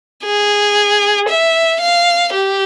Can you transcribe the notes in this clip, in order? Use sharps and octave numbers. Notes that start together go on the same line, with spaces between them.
G#4
E5
F5
G4